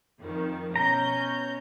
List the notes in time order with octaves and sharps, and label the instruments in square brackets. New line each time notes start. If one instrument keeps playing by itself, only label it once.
[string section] F2 D#3
[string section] B2 C#4 G6 [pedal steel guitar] A#5